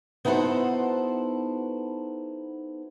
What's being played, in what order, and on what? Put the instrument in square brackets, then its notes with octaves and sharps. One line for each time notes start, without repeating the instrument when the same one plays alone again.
[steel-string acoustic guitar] B3 D#4 E4 F#4 A4 C5